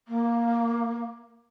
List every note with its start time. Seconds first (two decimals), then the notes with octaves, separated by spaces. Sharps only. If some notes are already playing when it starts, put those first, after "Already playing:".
0.08 A#3